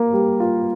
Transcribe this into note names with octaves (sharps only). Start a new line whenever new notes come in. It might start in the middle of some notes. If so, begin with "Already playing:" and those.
Already playing: A#3 A#4
G3
F4